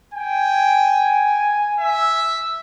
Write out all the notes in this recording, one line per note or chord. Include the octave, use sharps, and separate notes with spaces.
G5 G#5
E5